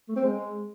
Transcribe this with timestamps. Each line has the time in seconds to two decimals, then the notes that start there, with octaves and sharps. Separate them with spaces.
0.09 A3
0.16 C4
0.23 G#3